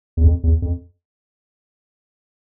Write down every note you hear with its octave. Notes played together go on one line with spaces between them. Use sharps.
E2
F2
E2
F2